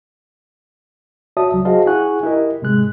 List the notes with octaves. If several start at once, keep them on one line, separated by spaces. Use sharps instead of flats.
F#4 C#5 D5 E5 A5 D#6
C#2 F#3
F#4 G#4 C5 D#5 F5 A5
E4 G#4 F#5 G#5 C#6 F#6
E4 G4 A#4 D#5
G#2 C3 G#3 F#6